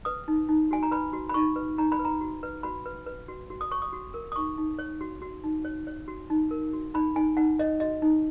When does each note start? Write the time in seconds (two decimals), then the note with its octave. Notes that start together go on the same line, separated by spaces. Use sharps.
0.05 B4 D#6
0.28 D#4
0.49 D#4
0.71 F#4 G#5
0.83 A#5
0.91 B4 B5
1.13 F#4
1.30 B5
1.34 D#4 C#6
1.56 B4
1.78 D#4 A#5
1.92 B5
1.99 B4
2.05 A#5
2.21 F#4
2.43 B4
2.63 F#4 B5
2.86 B4
3.06 B4
3.28 F#4
3.50 F#4
3.61 D#6
3.71 C#5 C#6
3.82 D#6
3.93 F#4
4.14 A#4
4.32 D#6
4.36 D#4 C#6
4.58 D#4
4.79 C#5
5.01 F#4
5.22 F#4
5.44 D#4
5.65 C#5
5.87 C#5
6.08 F#4
6.30 D#4
6.51 A#4
6.73 F#4
6.94 D#4 B5
7.16 D#4 G#5
7.37 D#4 F#5
7.59 C#5 D#5
7.80 F#4 D#5
8.02 D#4